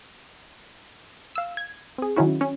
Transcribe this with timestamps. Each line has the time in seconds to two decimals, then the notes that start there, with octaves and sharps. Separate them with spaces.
1.36 F5 E6
1.57 G#6
1.98 C4 G#4
2.16 D#3 F#3 C#4 E4 F#4
2.41 C#4